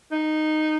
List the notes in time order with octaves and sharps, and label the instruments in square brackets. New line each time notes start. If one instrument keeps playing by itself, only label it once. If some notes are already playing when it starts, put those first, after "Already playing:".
[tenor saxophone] D#4